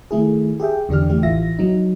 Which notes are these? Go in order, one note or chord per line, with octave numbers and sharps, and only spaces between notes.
D#3 A3 E4 G#4
G4 G#4 E5 G5
E2 D3 D4 G4 F6
E3 A3 G4
A1 E3 F4 E5 A#6
F#3 D#4